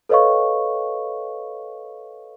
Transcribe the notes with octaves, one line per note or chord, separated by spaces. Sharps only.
A4 B4 C#5 D#5 F5 C#6